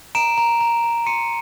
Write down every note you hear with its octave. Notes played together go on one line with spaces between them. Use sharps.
A#5 D7 E7
A#5
A#5
A#5
C6 C#7 D#7